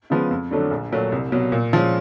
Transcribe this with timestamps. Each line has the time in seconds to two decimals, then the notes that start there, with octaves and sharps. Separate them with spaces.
0.10 C#3 F3 G#3 B3
0.31 F2
0.51 D3 F#3 A3 D4
0.71 A#1
0.92 A#2 F#3 A3
1.12 C2
1.32 B2 F#3
1.52 A#2
1.73 F3 G#3 C#4